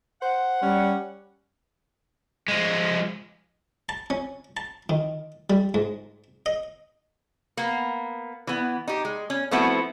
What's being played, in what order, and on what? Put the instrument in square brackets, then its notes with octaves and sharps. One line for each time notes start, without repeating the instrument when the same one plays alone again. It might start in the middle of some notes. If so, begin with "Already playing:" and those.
[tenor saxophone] C5 [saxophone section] F#5
[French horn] G3 [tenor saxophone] C#4
[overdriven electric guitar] F3 G#3
[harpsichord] A5
C#4
A5
D#3
G3
G#2
D#5
[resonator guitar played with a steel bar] A#3 B3
E3 B3
D#4 G4
G#3
C#4
F3 A3 B3 C4 E4 F#4